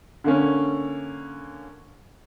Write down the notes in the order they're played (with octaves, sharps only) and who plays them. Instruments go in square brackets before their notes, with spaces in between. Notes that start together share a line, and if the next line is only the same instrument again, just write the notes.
[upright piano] D3 A#3 C#4